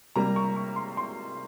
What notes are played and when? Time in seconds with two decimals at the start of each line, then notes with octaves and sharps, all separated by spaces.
0.16 C3 G3 A#3 A#5
0.36 C#6
0.56 C#6
0.76 C6
0.97 C6